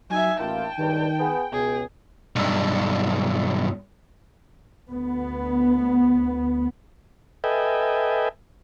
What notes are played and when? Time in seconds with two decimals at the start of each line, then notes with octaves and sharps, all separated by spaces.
0.10 F#3 D#4 E5 G#5
0.40 A1 A#3 E4 F4 G5 A5
0.78 C#2 G2 D#3 G3
1.19 B3 G#4
1.52 C#2 B2 G#4
2.36 B1 G2
4.90 D2 B3
7.44 A4 B4 D#5 E5 G5 G#5